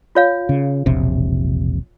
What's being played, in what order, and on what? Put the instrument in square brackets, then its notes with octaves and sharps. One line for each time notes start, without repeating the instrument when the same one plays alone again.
[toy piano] F4 C#5 F5
[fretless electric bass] C#3
E1 A#1 C3